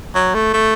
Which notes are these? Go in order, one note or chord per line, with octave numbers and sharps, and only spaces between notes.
F#3
A3
A3